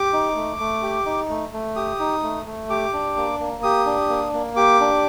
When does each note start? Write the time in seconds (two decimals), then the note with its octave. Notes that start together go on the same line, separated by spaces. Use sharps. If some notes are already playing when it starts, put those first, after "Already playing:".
Already playing: G4 D6
0.13 D#4
0.36 A3
0.59 A3
0.82 G4
1.06 D#4
1.30 A3
1.53 A3
1.76 G4 D#6
2.00 D#4
2.23 A3
2.46 A3
2.70 G4 D6
2.93 D4
3.17 A#3
3.40 A#3
3.63 G4 D#6
3.86 D4
4.09 A#3
4.34 A#3
4.56 G4 D6
4.80 D4